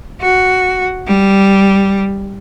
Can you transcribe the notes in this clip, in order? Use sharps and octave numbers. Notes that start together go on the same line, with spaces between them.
F#4
G3